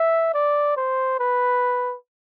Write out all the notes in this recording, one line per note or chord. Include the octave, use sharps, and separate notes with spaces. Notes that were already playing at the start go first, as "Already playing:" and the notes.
Already playing: E5
D5
C5
B4